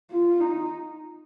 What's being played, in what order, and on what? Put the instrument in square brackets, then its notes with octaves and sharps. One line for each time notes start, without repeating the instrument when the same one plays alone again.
[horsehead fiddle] F4
D#4